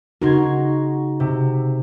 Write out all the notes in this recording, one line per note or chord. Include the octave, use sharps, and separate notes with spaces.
C#3 D#4 F#4 A#4 C6 G#6
C3